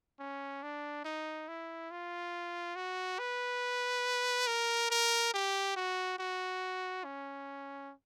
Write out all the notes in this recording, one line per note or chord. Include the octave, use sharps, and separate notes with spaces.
C#4
D4
D#4
E4
F4
F#4
B4
A#4
A#4
G4
F#4
F#4
C#4